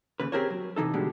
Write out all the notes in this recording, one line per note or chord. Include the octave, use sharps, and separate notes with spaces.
D#2 C#3 B4
C4 G4 G#4 A#4 C5 C#5
F#3
C3 E3 D#4 A4
B2 D3 G3 G#3